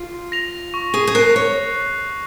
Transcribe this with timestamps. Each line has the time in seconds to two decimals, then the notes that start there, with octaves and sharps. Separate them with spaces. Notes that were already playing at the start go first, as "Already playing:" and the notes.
Already playing: F4
0.32 A#6 F7
0.74 C#6
0.94 G#4
1.07 G#4
1.15 A#4 F#6 C7
1.36 C#5